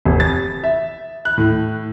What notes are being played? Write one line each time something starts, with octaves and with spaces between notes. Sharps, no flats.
F1
A6
E5
F#6
A2